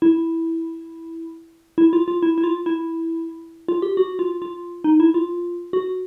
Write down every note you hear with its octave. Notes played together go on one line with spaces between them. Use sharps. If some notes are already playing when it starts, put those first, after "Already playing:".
E4
E4
F4
F4
E4
E4
F4
E4
F4
G4
F#4
F4
F4
D#4
E4
F4
F#4